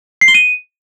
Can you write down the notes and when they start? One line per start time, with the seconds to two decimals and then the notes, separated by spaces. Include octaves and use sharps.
0.21 C7
0.28 G7
0.34 D#7